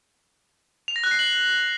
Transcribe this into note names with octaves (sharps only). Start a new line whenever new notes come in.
F7
A#6
F#6
C7
F#7